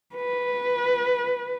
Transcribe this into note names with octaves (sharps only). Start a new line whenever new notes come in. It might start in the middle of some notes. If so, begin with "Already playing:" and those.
B4